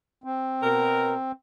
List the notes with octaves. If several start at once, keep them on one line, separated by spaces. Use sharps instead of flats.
C4
B2 A#4